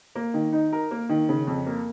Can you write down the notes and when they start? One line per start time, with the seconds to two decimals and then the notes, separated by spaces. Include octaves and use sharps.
0.16 A#3
0.34 D#3
0.52 D#4
0.72 A#4
0.91 A#3
1.09 D#3
1.29 C#3
1.47 F2
1.66 A#3